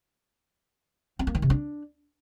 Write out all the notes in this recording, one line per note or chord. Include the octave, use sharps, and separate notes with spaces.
C4
A#3
D#3
C3
D4